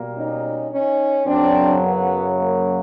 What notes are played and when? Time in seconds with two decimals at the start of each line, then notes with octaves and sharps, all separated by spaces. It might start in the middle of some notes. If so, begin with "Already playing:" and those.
Already playing: B2 G3 A#3
0.16 C#4 D#4
0.72 C#4 D#4
1.26 F#2 C#3 F#3 C4 D4
1.82 B3
2.38 A#3